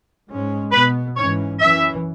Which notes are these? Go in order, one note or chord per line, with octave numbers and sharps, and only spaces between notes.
G#2 G#3 C#4
B2 B3 B4
G#2 E3 C#4 C#5
F#2 E3 C#4 E5